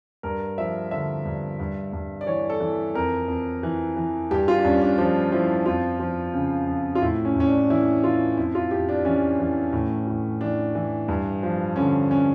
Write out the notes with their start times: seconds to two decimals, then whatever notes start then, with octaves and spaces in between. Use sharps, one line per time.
0.23 G2 A#4
0.58 F3 E5
0.91 D3 E5
1.25 G2
1.60 G2
1.93 G2
2.21 D5
2.26 E3 C#5
2.50 A4
2.60 E3
2.95 F2 A#4
3.28 F2
3.63 E3
3.96 E3
4.31 G2 G4
4.48 F4
4.59 D4
4.64 G2 C#4
4.82 D4
4.98 F3 D4
5.32 F3 E4
5.66 F2 F4
6.00 F3
6.34 C#3
6.67 F2
6.95 F4
7.02 A2 E4
7.25 C#4
7.35 A2 C#4
7.47 D4
7.70 E3 E4
8.03 E3 F4
8.37 F2 E4
8.55 F4
8.71 F2 G4
8.89 D4
9.05 E3 C#4
9.40 E3
9.73 A2
10.07 A2
10.41 E3 D4
10.75 E3
11.08 G2
11.43 F3
11.76 D3 C#4
12.11 C#4